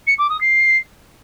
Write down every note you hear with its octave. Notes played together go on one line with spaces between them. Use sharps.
C#7
D6
D#6
C7